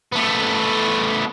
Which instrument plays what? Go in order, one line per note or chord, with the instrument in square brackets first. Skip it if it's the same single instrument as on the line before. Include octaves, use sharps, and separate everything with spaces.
[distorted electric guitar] A3 B3